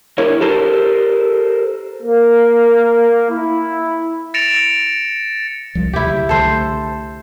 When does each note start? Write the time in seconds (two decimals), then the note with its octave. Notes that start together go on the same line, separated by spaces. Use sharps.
0.18 D4 E4 A#4 C#5
0.41 G4 A4 A#4 C5
2.03 A#3
3.30 E4
4.34 A6 A#6 C#7 D7 E7 F7
5.75 C2 F3 G3
5.93 D2 C3 E4 G4
6.06 C#3 F#3
6.29 C2 D3 A3 A4 C5